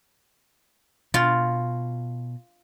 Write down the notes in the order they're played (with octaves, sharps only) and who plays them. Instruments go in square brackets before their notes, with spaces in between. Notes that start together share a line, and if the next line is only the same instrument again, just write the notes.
[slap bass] B2 [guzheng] F4